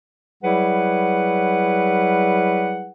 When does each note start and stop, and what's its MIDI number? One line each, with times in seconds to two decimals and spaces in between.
0.43 2.90 54
0.43 2.90 55
0.43 2.90 64
0.43 2.90 68
0.43 2.90 71
0.43 2.90 78